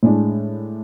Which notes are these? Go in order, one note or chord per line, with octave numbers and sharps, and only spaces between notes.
A2 G#3 D4